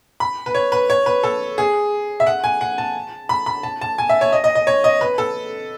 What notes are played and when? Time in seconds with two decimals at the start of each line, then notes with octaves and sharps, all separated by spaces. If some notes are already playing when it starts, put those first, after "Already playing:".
0.20 B5
0.46 B4
0.55 C#5
0.72 B4
0.90 C#5
1.06 B4
1.23 A4
1.58 G#4
2.20 E5
2.27 F#5
2.44 G#5
2.61 F#5
2.78 A5
3.29 B5
3.46 B5
3.63 A5
3.81 A5
3.98 G#5
4.09 E5
4.21 C#5
4.32 D#5
4.44 D#5
4.55 D#5
4.67 C#5
4.84 D#5
5.01 B4
5.18 A4